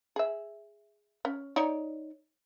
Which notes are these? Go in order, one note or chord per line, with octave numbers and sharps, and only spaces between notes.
G#4 E5
C#4
D#4 C#5 D5